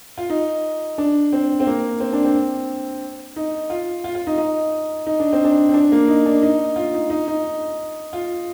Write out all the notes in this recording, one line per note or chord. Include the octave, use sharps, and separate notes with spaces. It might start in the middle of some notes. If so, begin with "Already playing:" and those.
F4
D#4
D4
C4
C4
A#3
C4
D4
C4
D#4
F4
F4
F4
D#4
D#4
D#4
D4
C4
D4
C4
D4
A#3
D#4
D4
D#4
F4
D#4
D#4
D#4
F4